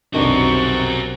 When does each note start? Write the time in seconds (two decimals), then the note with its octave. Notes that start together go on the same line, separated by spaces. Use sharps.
0.14 B1 F2 C3 D#3 D4 F#4 A#4 C#6